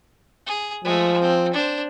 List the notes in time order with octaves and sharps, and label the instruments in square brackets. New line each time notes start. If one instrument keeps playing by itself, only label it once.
[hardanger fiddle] G#4
[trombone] F3 [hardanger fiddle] G#3 A3
[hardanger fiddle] C4
D4 C5